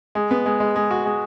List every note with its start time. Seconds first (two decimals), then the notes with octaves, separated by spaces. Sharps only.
0.15 G#3
0.31 B3
0.46 G#3
0.60 G#3
0.76 G#3
0.91 F#4
1.05 G#3